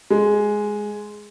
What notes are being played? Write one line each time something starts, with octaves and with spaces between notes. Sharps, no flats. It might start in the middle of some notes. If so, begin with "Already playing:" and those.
G#3